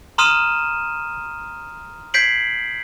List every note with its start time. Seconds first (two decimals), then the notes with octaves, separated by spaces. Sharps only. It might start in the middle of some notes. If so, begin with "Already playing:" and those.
0.18 A#5 C6 D#6 F6 D#7 E7
2.14 G6 G#6 B6 C7 D7 F#7